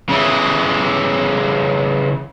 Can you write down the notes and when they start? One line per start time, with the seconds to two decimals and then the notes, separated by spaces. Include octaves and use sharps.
0.09 C#3 E3